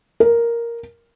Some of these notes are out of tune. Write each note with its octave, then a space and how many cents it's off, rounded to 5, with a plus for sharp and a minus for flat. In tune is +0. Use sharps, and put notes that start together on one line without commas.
A#4 +0